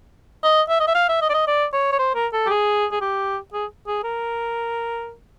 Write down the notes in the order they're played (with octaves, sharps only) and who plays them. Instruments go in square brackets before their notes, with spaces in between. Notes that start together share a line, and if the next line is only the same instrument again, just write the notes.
[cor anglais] D#5
E5
D#5
E5
F5
E5
D#5
D5
D#5
D5
C#5
C#5
C5
A#4
A4
G4
G#4
G#4
G4
G#4
G#4
A#4